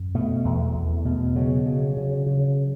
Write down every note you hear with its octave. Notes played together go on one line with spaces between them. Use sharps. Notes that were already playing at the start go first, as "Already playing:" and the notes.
Already playing: F#2
B2 A3
E2
E2
B2
C#3 F#3
C#3
C#3
C#3